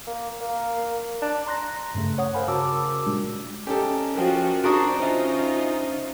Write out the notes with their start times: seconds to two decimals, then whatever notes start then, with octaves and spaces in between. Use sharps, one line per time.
0.07 A#3
0.41 A#3
1.22 D4
1.46 A#5 C6 F#6 A#6
1.95 G2 C#3 A3
2.18 C#5 F#5 D#6
2.34 A#4 C5 F5 F#5 G#5 B5
2.48 C#3 F#4 A#4 A5 D6 E6
3.06 A#2 G3 G#3 D4
3.67 C#4 D#4 G4 A4
4.15 F3 F#4 A#4 G5
4.64 D4 F#4 C5 A#5 C#6 D#6 D7
5.00 D3 C#4 D#4 F4 C5 E5